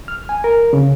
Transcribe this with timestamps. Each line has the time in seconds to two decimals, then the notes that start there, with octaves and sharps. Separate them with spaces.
0.08 F6
0.29 G#5
0.44 A#4
0.73 C#3